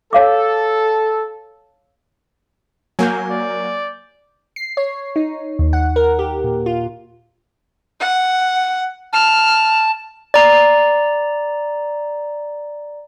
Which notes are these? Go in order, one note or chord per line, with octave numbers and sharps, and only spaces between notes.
A4 C#5 F5 D6
F#3 A#3 G#5 G6
D5
C7
C#5
D#4
D#2
F#5
A#4
G4
A#2
F4
F#5
A5 F6
D5 A#5